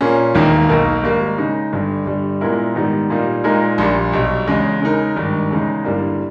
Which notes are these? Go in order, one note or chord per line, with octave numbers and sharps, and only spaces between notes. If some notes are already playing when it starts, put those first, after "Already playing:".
A#2 A#3 C#4 G#4
E1 D#2 D#3 A#3 D#4
B1 B2 A#3 D#4 A#4
G#1 G#2 G3 A#3
C#3 G#3 D#4
G1 G2 G3
G1 G2 G3
A#2 G#3 B3 E4 A#4
G#2 D#3 G3 B3 D#4
A#2 G3 A#3 D#4
A#2 G#3 D#4 A#4
A#1 A#2 G3
B1 B2 G3
E2 C#3 G#3
C#3 G#3 D#4 A#4
G#1 G2 D#3
E2 C#3 G#3 D#4
G1 G2 E3 G3 A#3